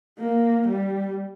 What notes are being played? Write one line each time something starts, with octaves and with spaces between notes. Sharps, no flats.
A#3
G3